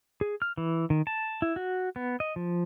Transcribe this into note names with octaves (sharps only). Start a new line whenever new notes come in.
G#4
F6
E3
D#3
A5
E4
F#4
B3
D#5
F3